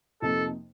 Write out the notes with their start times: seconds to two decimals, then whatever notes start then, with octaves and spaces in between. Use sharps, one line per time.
0.22 F2 C3 F3 A#3 D#4 A4